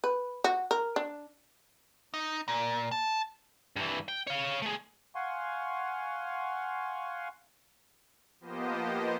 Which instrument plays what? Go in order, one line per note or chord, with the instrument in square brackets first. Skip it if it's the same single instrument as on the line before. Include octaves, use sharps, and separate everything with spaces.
[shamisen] B4
F#4
A#4
D4
[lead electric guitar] D#4
A#2
A5
[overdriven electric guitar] G2 E3
G5
C#5 F5
A3 G#4
[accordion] F5 F#5 G#5 C6 C#6
[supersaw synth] F3 A#3 B3 G4 C5 D#5